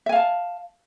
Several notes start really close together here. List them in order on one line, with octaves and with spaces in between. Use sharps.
E5 G#5 F5 A5